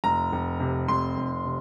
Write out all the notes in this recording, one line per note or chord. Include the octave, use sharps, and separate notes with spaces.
F1 A#5
F1
C3
F1 C6
F1
C3